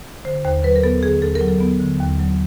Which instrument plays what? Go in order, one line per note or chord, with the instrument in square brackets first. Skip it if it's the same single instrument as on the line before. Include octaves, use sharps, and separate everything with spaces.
[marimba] D3 C5
D#2 C5
F#3 B4
A#4
B3 A4
D3 G#4
D#2 A4
A#4
F#3
A4
B3
D3
D#2
F#3